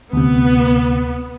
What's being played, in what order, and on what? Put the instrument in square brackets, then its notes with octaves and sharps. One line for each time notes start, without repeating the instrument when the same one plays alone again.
[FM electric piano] D2 C3 [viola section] B3